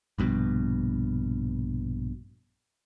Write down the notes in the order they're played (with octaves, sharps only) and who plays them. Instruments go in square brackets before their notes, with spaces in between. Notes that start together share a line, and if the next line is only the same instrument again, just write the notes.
[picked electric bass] A#1 G2 B2